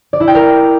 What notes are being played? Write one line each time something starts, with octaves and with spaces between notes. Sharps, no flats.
D5
E4
G5
A#4